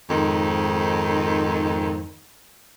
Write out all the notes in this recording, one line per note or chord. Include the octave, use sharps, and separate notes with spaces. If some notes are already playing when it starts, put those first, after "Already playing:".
F2 G#2 D#3